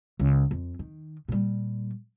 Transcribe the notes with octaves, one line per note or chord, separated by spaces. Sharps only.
C#2
F2
D#3
A#2 G3